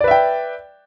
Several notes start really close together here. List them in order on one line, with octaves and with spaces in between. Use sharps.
D5 B4 E5 G5